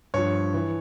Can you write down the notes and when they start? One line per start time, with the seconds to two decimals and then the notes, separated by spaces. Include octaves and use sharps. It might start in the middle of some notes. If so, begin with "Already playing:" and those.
0.14 G2 F3 C#5
0.54 E3